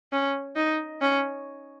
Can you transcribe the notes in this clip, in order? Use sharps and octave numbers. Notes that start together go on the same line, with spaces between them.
C#4
D#4
C#4